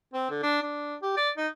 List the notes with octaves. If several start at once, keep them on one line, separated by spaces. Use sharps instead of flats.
C4
D3
D4
D4
G4
D5
D#4